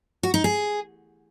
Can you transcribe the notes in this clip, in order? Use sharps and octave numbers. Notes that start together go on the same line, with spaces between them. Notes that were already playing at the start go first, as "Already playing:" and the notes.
F#4
D#4
G#4